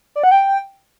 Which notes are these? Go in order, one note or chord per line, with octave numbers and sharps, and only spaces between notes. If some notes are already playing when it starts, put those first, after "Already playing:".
D5
F#5
G5